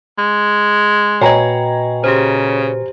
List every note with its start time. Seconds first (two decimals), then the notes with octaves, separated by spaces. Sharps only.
0.18 G#3
1.21 A#2 F#4 B4 C#5 D#5 G5 G#5 A#5
2.04 C#3 G4 C5